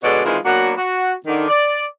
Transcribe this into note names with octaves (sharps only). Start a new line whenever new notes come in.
B2 D3 G#3 F#4 C#5 D5
D#3 E3 G#3 C4 F4 A#4
F#3 A#3 B3 D4 F#4
F#4
D3 D#3
D5